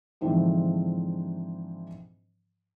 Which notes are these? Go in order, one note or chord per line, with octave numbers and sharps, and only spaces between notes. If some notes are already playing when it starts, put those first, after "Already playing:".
G#2 D3 E3 F3 C4 D4